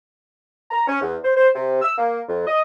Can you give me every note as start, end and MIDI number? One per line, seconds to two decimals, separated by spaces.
0.71 0.87 82
0.88 1.01 61
1.01 1.16 40
1.24 1.31 72
1.36 1.49 72
1.55 1.78 48
1.81 1.92 88
1.98 2.21 58
2.29 2.46 41
2.46 2.62 75